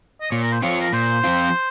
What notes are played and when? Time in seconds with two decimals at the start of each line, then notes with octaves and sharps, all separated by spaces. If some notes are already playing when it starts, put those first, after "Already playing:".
0.21 D#5
0.31 A#2 C#5
0.43 A#4
0.53 C5
0.62 F3 C4 F4 C#5
0.81 A#4
0.93 A#2 C5
1.24 F3 C4 F4